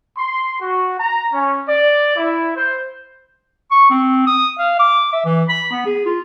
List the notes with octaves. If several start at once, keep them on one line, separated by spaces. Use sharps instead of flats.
C6
F#4
A#5
C#4
D5
E4
C5
C#6
C4
D#6
F5
D6
E5
E3
B5
B3
G#4
F4